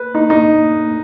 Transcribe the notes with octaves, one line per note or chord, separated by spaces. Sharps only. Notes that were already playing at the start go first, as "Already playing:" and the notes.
Already playing: B4
D#4
D#4